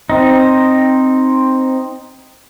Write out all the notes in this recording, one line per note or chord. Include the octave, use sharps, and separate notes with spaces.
C4 D#4